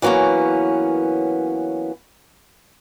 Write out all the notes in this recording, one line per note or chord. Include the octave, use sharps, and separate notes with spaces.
E3 F#3 A#3 B3 C#4